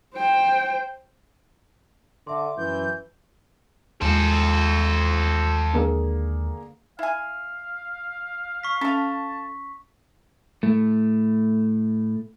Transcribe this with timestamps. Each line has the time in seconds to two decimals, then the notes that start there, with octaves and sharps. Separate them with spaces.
0.15 C5 G5
2.27 D3 E5 C6 D6
2.57 F#2 E3 G6
4.02 D#2 G#3 A4 C5
5.73 D3 A#3 G#4
6.99 E4 F5 G#5
8.63 C#6 B6
8.81 C#4 A4 F5 A5
10.63 A2 A3